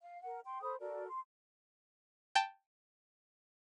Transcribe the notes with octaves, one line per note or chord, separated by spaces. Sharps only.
F5
A#4 F#5
G5 C6
A4 C5 B5 D#6
F#4 A4 A#4 D5
C6
G5 A5